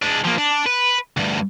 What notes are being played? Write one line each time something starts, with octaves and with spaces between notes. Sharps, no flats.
G#3 D4
F3 A#3
D4
B4
D2 G2